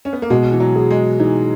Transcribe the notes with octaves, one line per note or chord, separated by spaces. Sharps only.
C#4
B3
A#3
B2 G#3
E3
F#3
G#4
G#3
E3 D#4